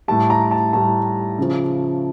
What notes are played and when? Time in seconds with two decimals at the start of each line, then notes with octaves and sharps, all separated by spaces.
0.08 A2 G3 A5
0.30 A#5
0.51 A5
0.73 A2 G3 A5
1.38 C#3 F3